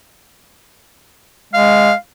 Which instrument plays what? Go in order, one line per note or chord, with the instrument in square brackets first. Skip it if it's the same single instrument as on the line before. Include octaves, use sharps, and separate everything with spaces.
[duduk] G#3 [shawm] F5